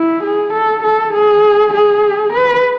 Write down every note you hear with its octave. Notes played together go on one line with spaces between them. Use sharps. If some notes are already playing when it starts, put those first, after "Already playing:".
Already playing: E4
G#4
A4
A4
G#4
G#4
B4